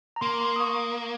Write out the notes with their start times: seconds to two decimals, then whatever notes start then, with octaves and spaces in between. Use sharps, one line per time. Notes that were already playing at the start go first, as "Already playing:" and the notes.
0.16 A#5
0.21 A#3 C6
0.41 C6
0.56 D#6
0.61 C#6